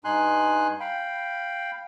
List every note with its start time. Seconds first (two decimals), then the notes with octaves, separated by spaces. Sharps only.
0.05 G2 D#4 G#5 C6 F#6
0.80 F5 G5 B5